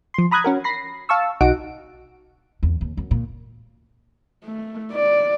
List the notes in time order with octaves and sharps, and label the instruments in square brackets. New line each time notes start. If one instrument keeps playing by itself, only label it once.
[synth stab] F3 C6
A#5 B5 D#6 F#6 G#6
C#4 F#4 A#4
B5 A#6 C7
F5 A5 C#6 E6
B1 D#4 F#4 F#5 D7
[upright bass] E2
D#2
F#2
A#2
[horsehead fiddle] A3
D5